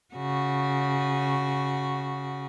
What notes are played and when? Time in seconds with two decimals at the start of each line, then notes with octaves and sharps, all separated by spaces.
0.14 C#3 F#4